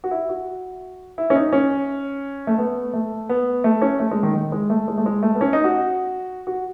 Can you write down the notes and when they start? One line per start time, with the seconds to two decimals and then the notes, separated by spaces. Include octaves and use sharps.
0.04 F#4
0.11 E4
0.29 F#4
1.18 E4
1.30 C#4
1.35 D#4
1.52 C#4
2.47 A3
2.58 B3
2.93 A3
3.29 B3
3.64 A3
3.82 C#4
4.00 A3
4.11 G#3
4.23 D#3
4.35 D#3
4.52 G#3
4.70 A3
4.88 G#3
4.98 A3
5.06 G#3
5.23 A3
5.35 B3
5.41 C#4
5.53 D#4
5.64 F#4
6.47 F#4